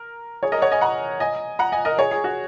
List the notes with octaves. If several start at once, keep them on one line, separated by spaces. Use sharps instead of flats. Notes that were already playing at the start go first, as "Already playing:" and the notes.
Already playing: A#4
G#4 C#5
A#4 D#5
C#5 F#5
D#5 G#5
F#5 A#5
D#5 G#5
F#5 A#5
D#5 G#5
A#4 D#5
G#4 C#5
G#4
F#4